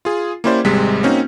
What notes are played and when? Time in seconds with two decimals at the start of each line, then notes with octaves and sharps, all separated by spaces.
0.05 F4 G#4
0.44 A#3 C#4 E4 G4 C5 D5
0.64 G#1 C3 G3 G#3 B6
1.03 A#3 C4 C#4 D#4 F#4